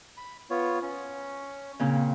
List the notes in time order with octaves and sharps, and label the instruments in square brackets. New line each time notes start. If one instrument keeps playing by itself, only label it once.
[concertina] B5
B3 F4 C#5
C#4
[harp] A#2 C#3 C4